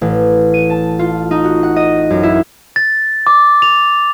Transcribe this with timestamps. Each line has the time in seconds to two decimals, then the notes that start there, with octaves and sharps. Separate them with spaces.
0.01 A1
0.54 D#7
0.70 A5
0.99 F4
1.31 D#4
1.44 F#4
1.63 F#5
1.76 D#5
2.10 F#2
2.23 E4
2.76 A6
3.27 D6
3.62 F7